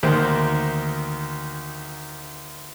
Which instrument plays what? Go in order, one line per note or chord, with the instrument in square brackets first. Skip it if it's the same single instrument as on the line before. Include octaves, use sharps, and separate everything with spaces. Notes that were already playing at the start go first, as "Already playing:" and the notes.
[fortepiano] D2 D#3 A#3 C5